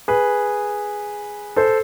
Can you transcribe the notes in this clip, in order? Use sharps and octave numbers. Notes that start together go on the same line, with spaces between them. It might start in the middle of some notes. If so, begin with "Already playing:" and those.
G#4 B4
A4 C5